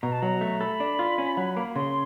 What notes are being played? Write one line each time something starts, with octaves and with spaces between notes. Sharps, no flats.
B2 A#5
A5
F#3 A#5
A3
A4 B5
D4
F4
C#4
F#3
A#3
C#3 C6